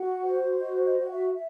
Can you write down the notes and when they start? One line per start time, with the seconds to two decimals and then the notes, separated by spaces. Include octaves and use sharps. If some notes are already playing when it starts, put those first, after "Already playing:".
Already playing: F#4 F#5
0.23 C5
0.60 F#4 D#5
0.85 D#5
0.97 F#4
1.05 F#5
1.10 E5
1.34 E5